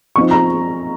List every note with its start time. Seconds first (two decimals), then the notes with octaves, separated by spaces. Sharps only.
0.16 F3 C4 D#4 C#6
0.31 A#5